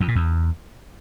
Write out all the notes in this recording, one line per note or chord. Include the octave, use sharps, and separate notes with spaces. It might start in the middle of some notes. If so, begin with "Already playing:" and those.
F2
A#2
E2